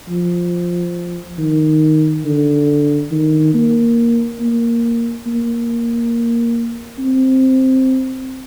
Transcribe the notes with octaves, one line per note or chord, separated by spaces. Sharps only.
F3
D#3
D3
D#3
A#3
A#3
A#3
C4